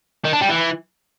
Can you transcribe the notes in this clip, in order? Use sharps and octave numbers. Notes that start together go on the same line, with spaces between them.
D#3
D4
G3
E3